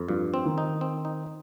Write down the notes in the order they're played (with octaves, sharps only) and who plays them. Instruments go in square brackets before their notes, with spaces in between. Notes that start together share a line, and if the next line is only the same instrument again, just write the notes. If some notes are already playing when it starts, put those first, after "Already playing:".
Already playing: [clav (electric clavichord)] F2
[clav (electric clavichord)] G2 [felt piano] F3
[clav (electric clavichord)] C4
[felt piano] D#3
[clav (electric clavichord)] D#4
C4
D#4